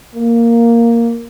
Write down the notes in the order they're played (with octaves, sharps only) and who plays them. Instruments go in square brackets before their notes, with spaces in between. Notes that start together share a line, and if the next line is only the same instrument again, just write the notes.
[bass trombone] A#3